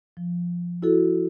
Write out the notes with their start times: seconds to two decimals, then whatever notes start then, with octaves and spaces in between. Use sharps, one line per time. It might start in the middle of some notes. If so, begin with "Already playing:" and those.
0.17 F3
0.82 E4 F#4 A4